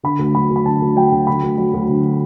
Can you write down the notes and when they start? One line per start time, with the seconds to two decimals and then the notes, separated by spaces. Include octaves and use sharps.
0.03 D3 B5
0.19 D2
0.35 F#3 B5
0.50 D2
0.56 B5
0.65 D3 A5
0.82 D2
0.96 F#3 G5
1.12 D2
1.27 D3 B5
1.43 D2
1.58 F#3
1.74 D2
1.89 D3